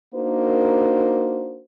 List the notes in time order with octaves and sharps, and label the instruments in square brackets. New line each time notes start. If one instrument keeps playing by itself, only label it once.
[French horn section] A#3 D4 D#4 F#4 A#4 C5